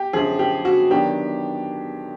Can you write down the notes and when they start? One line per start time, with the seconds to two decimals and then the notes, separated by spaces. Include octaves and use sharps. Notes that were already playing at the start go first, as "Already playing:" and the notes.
Already playing: G4
0.13 F#2 D3 F3 G#4
0.39 G4
0.65 F#4
0.90 D#3 F#3 B3 D4 G4